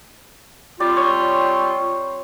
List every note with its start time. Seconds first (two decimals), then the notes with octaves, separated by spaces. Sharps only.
0.80 G3 C4 F4 D5
0.97 C#5